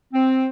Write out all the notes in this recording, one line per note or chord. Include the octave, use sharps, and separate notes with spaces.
C4